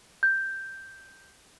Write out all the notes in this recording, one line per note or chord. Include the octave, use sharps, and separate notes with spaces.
G6